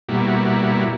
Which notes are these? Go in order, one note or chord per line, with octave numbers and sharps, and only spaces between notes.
B2 G3 A#3 E4 F#4